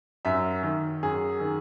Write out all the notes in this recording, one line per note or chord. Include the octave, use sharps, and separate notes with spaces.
F#2 E5
D#3
F#2 G#4
D#3